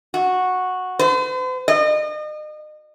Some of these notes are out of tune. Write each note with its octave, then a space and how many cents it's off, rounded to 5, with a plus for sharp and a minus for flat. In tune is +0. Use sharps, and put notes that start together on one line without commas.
F#4 -10
C5 -45
D#5 -35